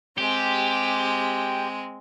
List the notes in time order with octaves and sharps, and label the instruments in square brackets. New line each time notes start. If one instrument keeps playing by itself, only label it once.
[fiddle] G#3 C4 [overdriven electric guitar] G4